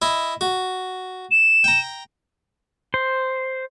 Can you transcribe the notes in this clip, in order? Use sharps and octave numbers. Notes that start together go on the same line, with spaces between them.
E4 D#5
F#4
E7
G5 A#5
C5